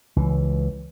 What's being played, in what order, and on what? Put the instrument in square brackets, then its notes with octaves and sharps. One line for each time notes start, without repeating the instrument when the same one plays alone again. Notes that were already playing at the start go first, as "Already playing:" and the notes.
[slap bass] C#2 E3